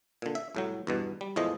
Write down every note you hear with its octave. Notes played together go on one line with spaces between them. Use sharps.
A#2 D3
E5
C2 A2 F#3
E2 G2 B2
G3
E2 A2 F3 G#3 D#5